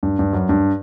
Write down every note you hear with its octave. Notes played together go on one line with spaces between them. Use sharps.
G2
G2
F#2
G2